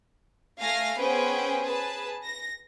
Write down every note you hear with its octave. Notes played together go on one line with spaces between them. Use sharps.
A3 F5 G#5 A#6 C7
B3 C#4 G#4 B4 C5 G5
G#4 B4 A5
A#6